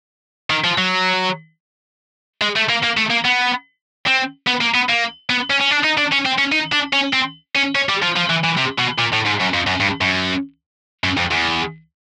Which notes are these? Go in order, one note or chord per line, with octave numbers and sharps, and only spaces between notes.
D#3
F3
F#3
G#3
A3
A#3
A#3
A3
A#3
B3
C4
B3
A#3
B3
A#3
B3
C#4
C#4
D4
D#4
D4
C#4
C4
C#4
D#4
D4
C#4
C4
C#4
C#4
G3
F3
F3
E3
E3
C3
B2
A#2
A2
G#2
F#2
F2
F#2
G2
F#2
F#2
F2
E2